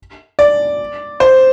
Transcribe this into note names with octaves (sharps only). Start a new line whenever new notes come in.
D5
C5